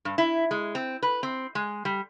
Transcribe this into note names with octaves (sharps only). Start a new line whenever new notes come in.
G2
E4
G#3
C4
B4
C4
G#3
G3